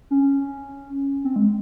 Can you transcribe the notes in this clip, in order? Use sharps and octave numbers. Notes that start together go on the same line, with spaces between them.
C#4
C4
G#3